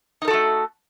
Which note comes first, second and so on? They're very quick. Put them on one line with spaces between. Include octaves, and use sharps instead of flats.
D#4 A#4 A4 F#4 A3